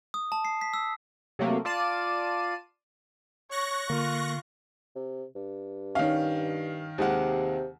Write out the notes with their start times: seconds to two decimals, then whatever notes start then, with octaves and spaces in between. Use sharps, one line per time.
0.14 D#6
0.32 A5
0.45 C7
0.61 B6
0.74 E6
1.39 C3 F#3 A3 A#3
1.65 F4 D5 A5 C7 D#7
3.51 C#5 C#6 F#6 A#6
3.90 D3 A#3 F4
4.96 C3
5.35 G2
5.95 D#3 C#4 F5
6.98 D#2 C3 G#3 F#5